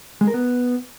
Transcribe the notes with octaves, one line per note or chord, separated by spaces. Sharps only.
G#3
A#4
B3